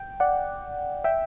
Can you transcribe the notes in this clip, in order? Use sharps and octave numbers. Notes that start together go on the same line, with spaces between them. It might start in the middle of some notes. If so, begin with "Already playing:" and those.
Already playing: G5
D5 F#5
E5 G5